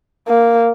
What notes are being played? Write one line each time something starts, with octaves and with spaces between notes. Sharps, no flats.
A#3